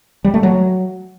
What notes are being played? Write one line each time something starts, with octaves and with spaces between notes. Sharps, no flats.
G3
A3
F#3